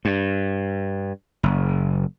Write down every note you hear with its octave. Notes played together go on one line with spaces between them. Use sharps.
G2
F#1